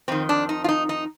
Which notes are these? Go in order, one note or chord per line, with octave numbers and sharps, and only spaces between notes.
F2 D#3 C4
D4
D#4
F4
D#4
D#4